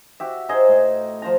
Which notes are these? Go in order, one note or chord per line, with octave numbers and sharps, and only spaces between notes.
F#4 G4 E5
D#4 G#4 C5 D#5
A2
F3 C5 A#5